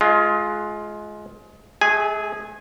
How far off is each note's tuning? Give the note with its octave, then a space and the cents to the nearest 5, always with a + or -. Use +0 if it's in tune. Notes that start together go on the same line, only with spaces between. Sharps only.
G#3 +20 F4 +0
A3 -45 G#4 -10 G#5 +0